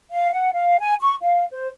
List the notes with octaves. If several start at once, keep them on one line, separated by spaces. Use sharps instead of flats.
F5
F#5
F5
G#5
C#6
F5
C5